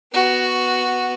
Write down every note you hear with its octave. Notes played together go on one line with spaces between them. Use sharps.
B3 F#4